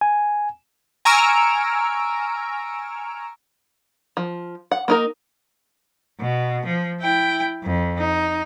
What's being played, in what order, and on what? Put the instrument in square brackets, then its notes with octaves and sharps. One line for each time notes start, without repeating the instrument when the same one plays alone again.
[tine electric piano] G#5
[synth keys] G#5 A#5 C#6 E6 F6 D7
[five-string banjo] F3
F#5
A#3 D#4 A#4
[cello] B2
F3
E4 G5
F2
D#4